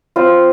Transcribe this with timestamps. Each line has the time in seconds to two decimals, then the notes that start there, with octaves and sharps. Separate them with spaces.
0.16 C4 F4